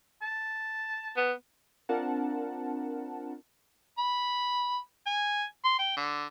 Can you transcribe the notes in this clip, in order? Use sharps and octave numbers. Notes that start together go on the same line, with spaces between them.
A5
B3
C4 D4 F4 A#4 F#5 A5
B5
G#5
C6
G5
D3